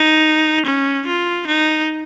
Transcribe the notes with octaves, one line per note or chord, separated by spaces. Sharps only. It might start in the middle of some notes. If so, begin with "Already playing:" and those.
Already playing: D#4
C#4
F4
D#4